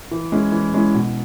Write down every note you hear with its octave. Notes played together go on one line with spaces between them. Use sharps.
E3
G#3 C#4 E4
E3
G#3 C#4 E4
B2